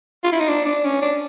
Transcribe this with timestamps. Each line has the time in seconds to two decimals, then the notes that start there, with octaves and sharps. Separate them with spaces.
0.24 F4
0.32 E4
0.39 D#4
0.49 D4
0.66 D4
0.84 C#4
1.02 D4